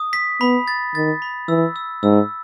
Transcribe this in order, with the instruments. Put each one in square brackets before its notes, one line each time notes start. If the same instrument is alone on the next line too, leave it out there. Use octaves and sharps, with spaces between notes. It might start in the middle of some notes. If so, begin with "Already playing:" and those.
Already playing: [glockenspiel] D#6
B6
[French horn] B3 [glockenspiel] B5
[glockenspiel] A6
[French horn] D#3 [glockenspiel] A6
[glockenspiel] B5
[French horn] E3 [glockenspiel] E6
[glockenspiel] E6
[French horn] G#2 [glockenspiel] E6